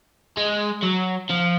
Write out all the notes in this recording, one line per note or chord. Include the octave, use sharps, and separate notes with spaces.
G#3
F#3
F3